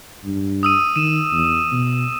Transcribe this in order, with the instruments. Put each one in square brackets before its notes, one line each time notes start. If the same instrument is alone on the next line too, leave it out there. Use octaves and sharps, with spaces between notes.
[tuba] G2
[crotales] D#6 E6 D#7
[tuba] D#3 [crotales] D#7 E7
[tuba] E2
B2